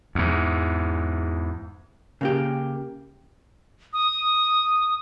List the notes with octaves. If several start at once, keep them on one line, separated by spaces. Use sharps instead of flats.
E2 G#2
C#3 A#3 G4
D#6